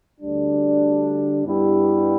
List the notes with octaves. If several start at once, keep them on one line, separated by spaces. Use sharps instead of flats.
D2 D3 G3 D4
G2 G3 B3 E4 G4